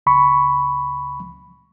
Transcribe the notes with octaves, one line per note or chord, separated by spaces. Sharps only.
C#2 B5 C#6